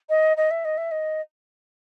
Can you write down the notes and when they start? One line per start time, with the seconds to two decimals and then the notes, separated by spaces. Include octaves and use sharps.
0.09 D#5
0.37 D#5
0.51 E5
0.65 D#5
0.77 E5
0.91 D#5